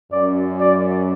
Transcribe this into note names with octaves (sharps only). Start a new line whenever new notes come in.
F#2 D5
D5